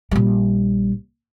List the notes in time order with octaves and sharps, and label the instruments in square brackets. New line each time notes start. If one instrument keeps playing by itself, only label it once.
[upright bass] A#1 G3